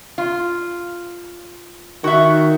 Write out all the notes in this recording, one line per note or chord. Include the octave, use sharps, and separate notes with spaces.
F4
D#3 F#4 E5